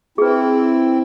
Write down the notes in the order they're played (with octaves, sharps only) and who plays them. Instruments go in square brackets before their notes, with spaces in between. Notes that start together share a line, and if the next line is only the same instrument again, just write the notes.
[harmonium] C4 E4 [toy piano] G#4 B4